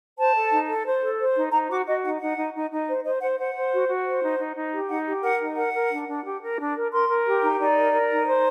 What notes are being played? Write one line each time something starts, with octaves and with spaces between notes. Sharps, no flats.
C5 A5
A4
D#4
A4
C5
A4
C5
D#4
D#4 A#5
F#4 D6
F#4 D#5
D#4 F#5
D#4 F#5
D#4
D#4
D#4
C5
C5 D#5
C5 F#5
C5 F#5
C5
F#4
F#4
C5
D#4
D#4
D#4
G4
D#4 F#5
G4
A#4 F#5
D#4
A#4 F#5
A#4
D4
D4
G4
A#4
D4
A#4
A#4 C6
A#4
G4
D#4
D#4 D5
A#4
A#4
D#4
C5